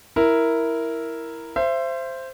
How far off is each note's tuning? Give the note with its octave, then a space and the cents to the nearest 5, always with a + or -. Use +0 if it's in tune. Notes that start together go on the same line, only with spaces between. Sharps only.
E4 +0 A#4 +0
C5 +0 E5 +35